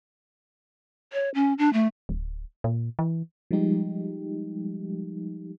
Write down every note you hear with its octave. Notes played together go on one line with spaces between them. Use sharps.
C#5
C#4
D4
A3
D1
A#2
E3
F3 G3 G#3 D#4 G4